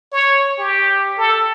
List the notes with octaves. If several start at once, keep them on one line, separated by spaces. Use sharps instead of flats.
C#5
G4
A4